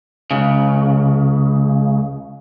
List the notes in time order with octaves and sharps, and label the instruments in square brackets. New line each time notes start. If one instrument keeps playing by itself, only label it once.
[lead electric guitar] C#2 C#3